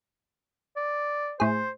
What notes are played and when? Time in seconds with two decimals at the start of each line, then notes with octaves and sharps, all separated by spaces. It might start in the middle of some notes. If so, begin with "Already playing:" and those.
0.76 D5
1.40 A2 G#4 C5